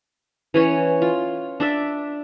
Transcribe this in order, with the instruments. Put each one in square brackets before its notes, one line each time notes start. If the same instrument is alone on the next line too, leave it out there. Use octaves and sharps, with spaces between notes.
[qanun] E3 C#4 C#5
F4
D4 D5 E5